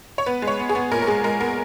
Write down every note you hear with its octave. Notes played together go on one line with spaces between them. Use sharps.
C#5
B3 B4
G#3
C#5
B3
G#4
B3
A#2 A#4
A#4
G#3 G#4
G#3 A#4
B3 A#4